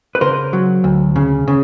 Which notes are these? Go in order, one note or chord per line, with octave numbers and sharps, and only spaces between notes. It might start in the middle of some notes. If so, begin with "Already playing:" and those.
B4
C#3 A#4 C5
F#3
D2
C#3
C#3